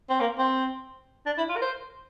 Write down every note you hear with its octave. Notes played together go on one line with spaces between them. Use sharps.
C4
A#3
C4
D4
E4
F4
A#4
C5